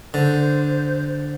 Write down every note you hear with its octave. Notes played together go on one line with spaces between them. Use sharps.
D3 C5